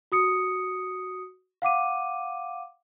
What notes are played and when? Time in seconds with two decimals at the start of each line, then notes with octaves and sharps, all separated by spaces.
0.12 F#4 D#6 C#7
1.62 F5 F#5 D6 D#7